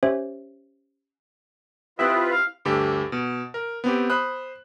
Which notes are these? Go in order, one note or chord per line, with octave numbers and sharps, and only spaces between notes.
C#4 G4 C5 C#5 E5
C4 E4 F4 G4 B4 D#5 E5 F#6
F5
D2 G2 G4 A4
B2
A#4
B3 C4 G4
C5 B5 D#6 F#6